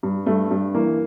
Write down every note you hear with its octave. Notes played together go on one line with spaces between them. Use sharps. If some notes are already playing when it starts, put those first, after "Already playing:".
G2
G2 A3
G2
E3 A#3